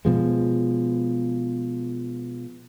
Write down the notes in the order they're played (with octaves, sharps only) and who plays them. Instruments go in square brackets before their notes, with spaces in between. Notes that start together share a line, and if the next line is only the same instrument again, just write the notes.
[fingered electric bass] B2 F3 G#3